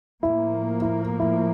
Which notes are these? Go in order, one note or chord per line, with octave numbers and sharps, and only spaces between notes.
A2 F3 A#3 E4
E4
E4